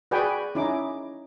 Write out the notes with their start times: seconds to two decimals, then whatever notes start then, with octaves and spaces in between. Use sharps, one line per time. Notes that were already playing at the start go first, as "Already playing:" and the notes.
0.11 F#4 G#4 B4 D5 G5 G#5
0.55 C#4 D#4 E4 D6